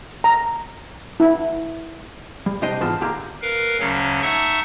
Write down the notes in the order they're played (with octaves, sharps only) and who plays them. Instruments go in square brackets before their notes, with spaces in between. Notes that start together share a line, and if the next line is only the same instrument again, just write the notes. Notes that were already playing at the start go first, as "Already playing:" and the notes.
[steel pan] A#5
E4
[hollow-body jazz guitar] G3
C2 D4 G4 C5 D#5 G5
G#2 E3 B3 F4 A5
D#2 D3 A#3 G4 F5 A#5
[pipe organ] A#4 B4 F5
D2 C#3 F#3 C#4
D#4 E5 F#5 A5 C#6 E6